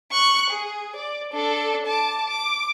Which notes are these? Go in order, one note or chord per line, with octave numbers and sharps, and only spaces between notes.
C#6 F#6
G#4
D5
D4 A4
A5 D6
D6